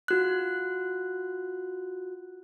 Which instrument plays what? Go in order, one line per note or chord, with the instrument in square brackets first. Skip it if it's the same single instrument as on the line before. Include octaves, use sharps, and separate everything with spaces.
[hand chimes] F4 F#4 F#6